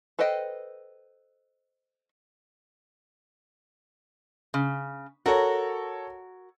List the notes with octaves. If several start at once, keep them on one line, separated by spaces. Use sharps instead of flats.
A4 B4 C5 D#5 G5
C#3
F#4 A4 A#4 C#5